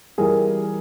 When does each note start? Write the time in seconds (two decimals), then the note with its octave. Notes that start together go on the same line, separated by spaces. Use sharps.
0.18 E3 G3 G#4 A#4